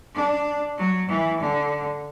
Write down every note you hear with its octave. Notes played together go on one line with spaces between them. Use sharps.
D4
F#3
E3
D3